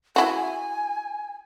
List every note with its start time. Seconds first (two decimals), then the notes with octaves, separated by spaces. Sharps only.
0.16 E4 F#4 G#5